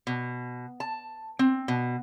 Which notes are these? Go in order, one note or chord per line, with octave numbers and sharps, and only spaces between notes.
B2
A5
C4
B2